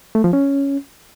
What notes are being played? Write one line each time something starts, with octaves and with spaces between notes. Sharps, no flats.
A3
F3
C#4